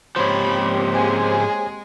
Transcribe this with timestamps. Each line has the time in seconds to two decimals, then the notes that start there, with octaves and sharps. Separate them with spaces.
0.16 G#2 F3 A#3 C4 G4 C5 C#5 B5
0.93 G#3 G#4